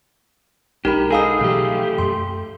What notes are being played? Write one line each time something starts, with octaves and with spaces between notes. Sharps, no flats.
B1 G#3 D4 D#4 G4 A#4 B5
D#4 G#4 A4 F5 D#6
B2 E3 F#3 A3 G4
F#2 C6